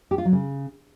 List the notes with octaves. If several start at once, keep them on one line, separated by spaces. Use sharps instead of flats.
G4
F4
F#3
C#3